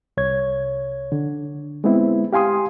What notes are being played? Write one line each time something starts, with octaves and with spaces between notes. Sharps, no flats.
C2 C#5 G#6
D3
G#3 B3 C4 E4
G4 F5 G#5 C6 D#6